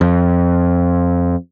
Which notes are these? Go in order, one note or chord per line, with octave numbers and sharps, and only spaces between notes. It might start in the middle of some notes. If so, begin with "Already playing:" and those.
F2